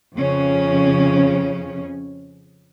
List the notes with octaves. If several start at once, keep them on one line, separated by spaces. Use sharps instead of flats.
F2 C#3 C#4